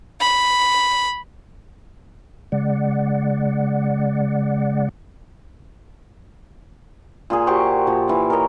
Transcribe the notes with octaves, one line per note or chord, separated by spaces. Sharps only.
B5
C#3 G#3 D5 F#5
A#2 F4 G#4
F#4 G4 C5 C#6
A#2 F3
A#2 E3
A#4 C#5 D#5 A#5